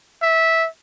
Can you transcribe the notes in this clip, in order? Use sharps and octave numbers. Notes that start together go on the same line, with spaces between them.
E5